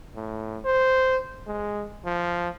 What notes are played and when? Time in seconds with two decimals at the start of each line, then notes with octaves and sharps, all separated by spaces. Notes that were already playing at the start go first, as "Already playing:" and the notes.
0.16 A2
0.65 C5
1.47 G#3
2.05 F3